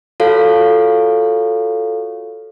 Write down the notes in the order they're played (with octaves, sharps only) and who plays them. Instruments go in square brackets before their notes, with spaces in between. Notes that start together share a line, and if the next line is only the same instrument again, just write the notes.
[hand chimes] F4 F#4 A4 C#5 F5